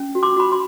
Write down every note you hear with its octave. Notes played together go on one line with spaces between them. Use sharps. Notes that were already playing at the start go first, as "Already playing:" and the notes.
Already playing: C#4
F#4
C6 D6
F#4 B5
C6